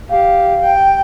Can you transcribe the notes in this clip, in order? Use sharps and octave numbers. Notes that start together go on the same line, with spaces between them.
G4 F5
G5